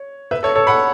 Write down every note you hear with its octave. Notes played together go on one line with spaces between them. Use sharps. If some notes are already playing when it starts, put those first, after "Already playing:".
Already playing: C#5
B4 E5
A4 C#5
A4 C#5
F#5 B5